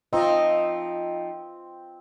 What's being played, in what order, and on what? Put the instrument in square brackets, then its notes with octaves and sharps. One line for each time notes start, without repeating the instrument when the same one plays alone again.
[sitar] F3 D#4 [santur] C4 [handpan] F4 D#5